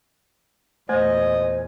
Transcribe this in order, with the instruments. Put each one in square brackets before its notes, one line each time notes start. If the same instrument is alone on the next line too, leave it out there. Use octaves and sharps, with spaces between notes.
[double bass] E2 A#2 [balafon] A3 [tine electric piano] C5 G#5 G#6 [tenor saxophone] D#5